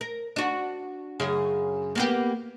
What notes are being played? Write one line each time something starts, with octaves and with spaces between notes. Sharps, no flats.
A#4
D4 F#4
F#2 C#3 G#4
A#3 B3 G4